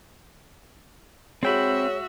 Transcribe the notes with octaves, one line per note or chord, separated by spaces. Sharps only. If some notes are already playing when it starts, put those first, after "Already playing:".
G#3 C4 F#4 G#4 C#5 E5 G5 B5